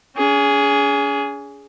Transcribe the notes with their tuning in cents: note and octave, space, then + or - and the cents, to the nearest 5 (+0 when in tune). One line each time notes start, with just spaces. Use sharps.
C#4 +45 G#4 +0